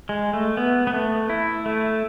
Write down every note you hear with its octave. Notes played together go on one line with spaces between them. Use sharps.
G#3
A3
B3
B3
A3
E4
A3